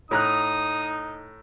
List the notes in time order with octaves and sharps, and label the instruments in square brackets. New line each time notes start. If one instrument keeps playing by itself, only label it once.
[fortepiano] A2 A#5 F#6 [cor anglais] D#4 [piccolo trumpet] D#6